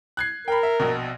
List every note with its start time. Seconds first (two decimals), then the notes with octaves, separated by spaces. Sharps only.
0.17 F#6 G#6 C7
0.48 A#4 G5 B5
0.63 E5
0.80 A#1 B2